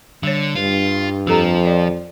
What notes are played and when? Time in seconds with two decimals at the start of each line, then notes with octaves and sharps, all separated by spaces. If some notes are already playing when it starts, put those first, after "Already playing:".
0.23 D3 G3 C#5
0.55 G2 F4
1.27 F2 F3 G4 A4 A#5
1.65 C5 D5